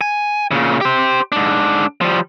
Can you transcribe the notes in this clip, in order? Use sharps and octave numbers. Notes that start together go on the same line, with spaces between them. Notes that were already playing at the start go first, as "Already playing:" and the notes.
G#5
A#2 C#3
G4 C5
G#2 D4
F3 G3